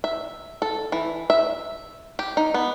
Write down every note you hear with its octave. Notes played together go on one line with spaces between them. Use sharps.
E5
A4
E3
E5
G4
D#4
B3